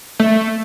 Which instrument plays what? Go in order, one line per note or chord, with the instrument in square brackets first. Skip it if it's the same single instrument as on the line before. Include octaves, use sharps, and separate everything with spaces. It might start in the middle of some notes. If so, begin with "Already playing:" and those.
[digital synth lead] A3